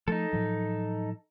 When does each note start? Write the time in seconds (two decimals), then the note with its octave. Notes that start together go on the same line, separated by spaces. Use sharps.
0.08 F3 A3 D#4 A4
0.33 A2 F3 F#3